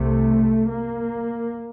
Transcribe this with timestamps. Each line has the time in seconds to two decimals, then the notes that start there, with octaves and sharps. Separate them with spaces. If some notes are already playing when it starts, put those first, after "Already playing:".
Already playing: C2 C3 A3
0.69 A#3